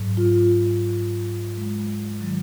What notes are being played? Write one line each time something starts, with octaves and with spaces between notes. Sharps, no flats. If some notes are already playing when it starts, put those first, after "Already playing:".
Already playing: G#2 F#3
F4
G#3
D#3 F#3